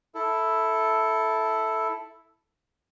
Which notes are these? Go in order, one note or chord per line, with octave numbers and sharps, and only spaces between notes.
E4 A4